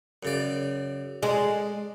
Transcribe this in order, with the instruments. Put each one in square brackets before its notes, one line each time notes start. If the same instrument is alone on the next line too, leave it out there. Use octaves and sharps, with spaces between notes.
[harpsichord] F#2 C#3 D5
[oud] G#3 [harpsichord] D4